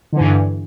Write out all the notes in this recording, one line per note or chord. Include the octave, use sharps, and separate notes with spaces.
G2 D3 E3